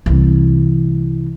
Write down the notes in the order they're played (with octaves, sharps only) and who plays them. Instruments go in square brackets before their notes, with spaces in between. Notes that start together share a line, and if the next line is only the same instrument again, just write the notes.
[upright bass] C2 E3